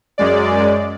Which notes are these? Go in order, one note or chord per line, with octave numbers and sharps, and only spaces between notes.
F#2 G#3 D5